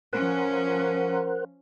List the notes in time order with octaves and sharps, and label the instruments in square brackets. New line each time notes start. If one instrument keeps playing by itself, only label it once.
[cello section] F3 C#4 [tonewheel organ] A#4 C5 F#5